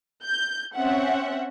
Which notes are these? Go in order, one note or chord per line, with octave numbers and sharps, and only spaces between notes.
G6
C4 C#4 E5 F#5